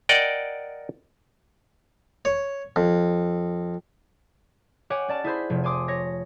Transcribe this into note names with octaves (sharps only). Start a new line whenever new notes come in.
A#4 D5 D#5 F#5 G5
C#5
F2
G4 C#5 F#5 G#5 D6
C#4 D5 A5
E4 G#4 C5 B5
F1
G#5 C6 D6 D#6
C#5 A#6